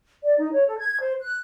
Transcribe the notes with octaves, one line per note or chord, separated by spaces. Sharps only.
D5
D#4
C#5
A4
G#6
C5
F#6